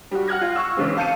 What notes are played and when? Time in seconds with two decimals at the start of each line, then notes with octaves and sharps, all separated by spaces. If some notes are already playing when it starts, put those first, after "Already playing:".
0.11 G3 F#4
0.28 F#5 F6 F#6 G#6 A#6
0.41 F4
0.55 C#6 E6
0.77 C#3 E3 G#3 C4
0.97 F5 A5 G6 C#7 D#7